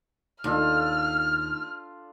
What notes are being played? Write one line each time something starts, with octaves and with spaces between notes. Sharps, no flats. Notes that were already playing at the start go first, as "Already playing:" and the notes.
D#2 D4 F4 A4 F6